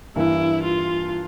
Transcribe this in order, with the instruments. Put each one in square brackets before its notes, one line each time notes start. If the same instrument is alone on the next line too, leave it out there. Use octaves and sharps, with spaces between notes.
[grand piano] G2 E3 A#3 [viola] E4
[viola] F4